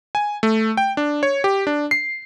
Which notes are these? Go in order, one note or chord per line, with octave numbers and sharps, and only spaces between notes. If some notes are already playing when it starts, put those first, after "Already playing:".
G#5
A3
G5
D4
C#5
G4
D4
C7